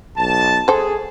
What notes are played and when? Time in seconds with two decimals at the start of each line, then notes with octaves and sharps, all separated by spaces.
0.17 B1 A5
0.68 G#4 A4 C5